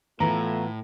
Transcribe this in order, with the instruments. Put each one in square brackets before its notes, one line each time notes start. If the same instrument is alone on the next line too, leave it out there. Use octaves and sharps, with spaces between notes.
[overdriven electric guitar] A2 [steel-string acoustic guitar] E3 B3 [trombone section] A3 F4 [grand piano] A#5